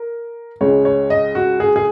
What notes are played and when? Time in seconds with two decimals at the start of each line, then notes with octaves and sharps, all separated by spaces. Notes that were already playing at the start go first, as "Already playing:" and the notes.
Already playing: A#4
0.61 C#2 C#3 G#3 C#5
0.85 C#5
1.10 D#5
1.35 F#4
1.60 G#4
1.76 G#4